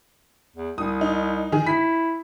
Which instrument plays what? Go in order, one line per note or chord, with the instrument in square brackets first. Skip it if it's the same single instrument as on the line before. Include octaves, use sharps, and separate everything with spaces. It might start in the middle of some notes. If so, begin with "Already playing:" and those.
[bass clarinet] E2
[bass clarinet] C2 [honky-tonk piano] D#6
[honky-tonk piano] D#4
D#3 G#4
[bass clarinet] E4 [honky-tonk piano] B6